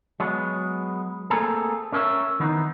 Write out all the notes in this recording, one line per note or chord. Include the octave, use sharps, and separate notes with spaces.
F#3 G#3 B3
A3 A#3 C4 G#4 A4
C#4 A#4 C#5 D#5 E5
D#3 E3 B3 C4 D#4